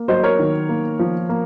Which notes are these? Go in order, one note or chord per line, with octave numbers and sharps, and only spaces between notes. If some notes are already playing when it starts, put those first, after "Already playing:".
Already playing: A#3
F#3 C5 D#5
A#4 C#5
D#3
A#3
F3
A#3